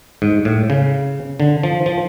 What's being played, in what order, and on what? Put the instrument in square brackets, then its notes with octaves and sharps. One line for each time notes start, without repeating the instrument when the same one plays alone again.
[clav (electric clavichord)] G#2
A2
C#3
D3
F3
F3